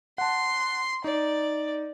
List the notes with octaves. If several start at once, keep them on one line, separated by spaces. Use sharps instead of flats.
F#5 A5 C6
D#4 D5